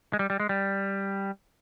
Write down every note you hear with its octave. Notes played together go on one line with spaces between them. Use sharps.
G#3
G3
G3
G#3
G3